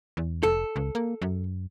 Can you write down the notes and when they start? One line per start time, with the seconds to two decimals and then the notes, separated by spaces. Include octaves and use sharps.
0.17 E2
0.43 F1 A4
0.76 C#2
0.95 A#3
1.22 F#2